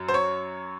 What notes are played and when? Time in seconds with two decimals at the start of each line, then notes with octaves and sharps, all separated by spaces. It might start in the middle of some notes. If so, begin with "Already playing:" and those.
Already playing: F#2
0.09 C5
0.14 C#5